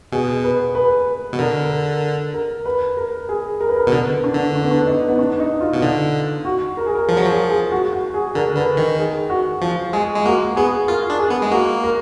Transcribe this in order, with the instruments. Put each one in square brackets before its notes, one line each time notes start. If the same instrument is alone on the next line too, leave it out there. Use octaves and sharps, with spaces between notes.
[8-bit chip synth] B2 [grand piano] G#4
[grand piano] B4
B4
[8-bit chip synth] B2
[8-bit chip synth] D3 [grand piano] A#4
[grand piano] A#4
A#4
B4
A#4
G#4
A#4
B4
A#4
[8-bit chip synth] B2
[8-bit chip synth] D3 [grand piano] B3
[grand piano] D4
[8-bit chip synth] D3
[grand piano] D4
B3
D4
D#4
B3
D4
D#4
F4
[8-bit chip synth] B2
D3
[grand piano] F#4
A#4
G#4
A#4
[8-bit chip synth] F3 [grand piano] A#4
[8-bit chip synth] F#3
[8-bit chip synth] F3 [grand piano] G#4
[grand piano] G#4
F#4
F#4
G#4
[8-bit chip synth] D3 [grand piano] A#4
[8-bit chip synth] D3 [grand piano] B4
[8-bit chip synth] D#3 [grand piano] A#4
[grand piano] G#4
F#4
[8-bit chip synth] F3 [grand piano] F4
[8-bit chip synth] G#3 [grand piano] G#4
[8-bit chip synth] G#3
[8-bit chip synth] A#3 [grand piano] F#4
[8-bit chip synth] B3 [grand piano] G#4
[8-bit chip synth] F4 [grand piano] A#4
[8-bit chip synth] D4
[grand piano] G#4
[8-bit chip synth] B3
G#3
[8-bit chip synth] A#3 [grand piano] F#4
[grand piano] A#4